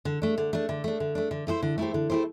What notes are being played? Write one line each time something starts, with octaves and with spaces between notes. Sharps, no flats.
D3
A3 D4
D3
A3 D4
D3
A3 D4
D3
A3 D4
D3
A3 E4 G4 C5
D3
A3 E4 G4 C5
D3
A3 E4 G4 C5